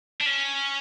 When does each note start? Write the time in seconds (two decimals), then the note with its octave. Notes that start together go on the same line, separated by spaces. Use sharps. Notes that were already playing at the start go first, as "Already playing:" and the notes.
0.21 D4
0.26 C#4